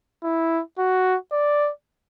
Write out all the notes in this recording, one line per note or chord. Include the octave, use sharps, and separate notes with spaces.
E4
F#4
D5